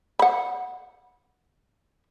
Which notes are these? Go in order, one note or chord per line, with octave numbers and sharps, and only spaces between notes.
F#5 B5